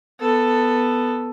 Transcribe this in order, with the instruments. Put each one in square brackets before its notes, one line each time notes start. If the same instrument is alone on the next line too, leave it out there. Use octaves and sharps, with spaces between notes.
[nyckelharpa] B3 A4